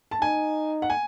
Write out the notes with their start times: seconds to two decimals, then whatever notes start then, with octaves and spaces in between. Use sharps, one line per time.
0.11 A5
0.22 D#4 G#5
0.82 F#5
0.90 G#5